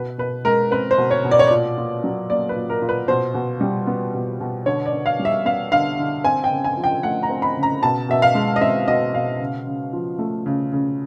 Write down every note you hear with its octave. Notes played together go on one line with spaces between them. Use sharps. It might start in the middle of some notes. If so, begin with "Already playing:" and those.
Already playing: B2 B4
B2 B4
G#3 A#4
C4 B4
C5
B2
C#5
B2
D5
C#5
A#2 D5
A#2
F#3
A#3 D5
B4
A#2
A#4
A#2
B4
B2 C5
B2
G3
B3
B2
B2
D3 C#5
D5
D3
F5
G3
E5
B3 F5
D3 F5
D3
C4 G#5
G5
C#3
G#5
F3
G5
A3 F#5
A#5
C4
B5
C#3
A#5
B2 A5
B2 E5
F5
G#3
D#5
C4 E5
B2 D#5
B2 F5
C#3
C#3
F3
A3
C#3
C#3